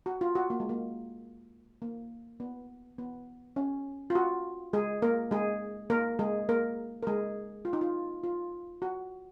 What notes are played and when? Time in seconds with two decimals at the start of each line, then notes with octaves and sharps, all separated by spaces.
0.06 F#4
0.21 F4
0.35 F#4
0.50 A#3
0.60 G#3
0.69 A#3
1.82 A#3
2.40 B3
2.98 B3
3.56 C#4
4.10 F4
4.15 F#4
4.73 G#3 G#4
5.02 A#3 A#4
5.31 G#3 G#4
5.90 A#3 A#4
6.19 G#3 G#4
6.49 A#3 A#4
7.03 A#4
7.07 G#3 G#4
7.65 F4
7.73 D#4
7.81 F4
8.24 F4
8.82 F#4